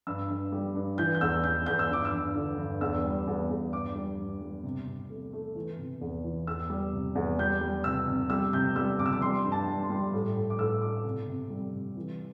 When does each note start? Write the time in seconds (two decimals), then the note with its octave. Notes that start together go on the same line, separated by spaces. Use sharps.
0.07 G2 E6
0.29 G2
0.52 G3
0.76 G2
0.98 E3 G6
1.15 G6
1.21 E2 E6
1.44 E2 G6
1.66 E2 G6
1.79 E6
1.90 G2 D6
2.05 E6
2.13 G2
2.35 D3
2.58 G2
2.81 E2 E6
3.04 G3
3.27 E2
3.50 E2
3.73 G2 D6
3.95 G3
4.19 G2
4.41 G3
4.64 C3
4.87 C3
5.10 A3
5.33 A3
5.56 E3
5.78 C3
6.01 E2
6.24 E3
6.47 E2 E6
6.70 G3
6.93 C3
7.15 E2
7.39 G3 G6
7.61 G3
7.84 C3 E6
8.08 C3
8.30 G3 E6
8.53 C3 G6
8.76 G3 E6
8.99 C3 D6
9.06 E6
9.13 D6
9.21 G3 C6
9.44 G2
9.52 A5
9.67 G3
9.83 C6
9.90 G3
10.13 A2
10.36 A2
10.50 D6
10.59 A2 E6
10.82 A3 D6
11.05 C3
11.27 C3
11.50 G3
11.73 C3
11.97 E3